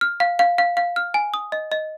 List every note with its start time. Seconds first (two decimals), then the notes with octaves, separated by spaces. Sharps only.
0.01 F6
0.20 F5
0.39 F5
0.58 F5
0.77 F5
0.96 F6
1.14 G#5
1.34 D#6
1.52 D#5
1.72 D#5